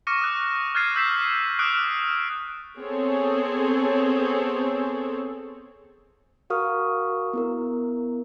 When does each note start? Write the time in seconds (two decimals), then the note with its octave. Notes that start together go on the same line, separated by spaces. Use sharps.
0.07 C#6 D6 F6 A#6 C#7 D#7
0.21 D#6 F#6
0.75 F6 F#6 G#6 A6 C7 D#7
0.96 E6 G6 B6 C7 E7
1.59 D6 D#6 F6 F#6 D7
1.74 F6
2.79 B3 C4 G#4 A4 C#5
6.50 F#4 A#4 F5 C#6 D#6 F6
7.33 B3 E4 A#4